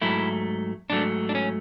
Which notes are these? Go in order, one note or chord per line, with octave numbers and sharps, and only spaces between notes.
G#2 F#3 A3 E4
G#2 F#3 A3 D4
D4
C#4